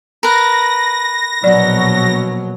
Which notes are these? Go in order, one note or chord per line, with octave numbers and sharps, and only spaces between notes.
A#4 B4 A#6
A#1 B2 F#3 D5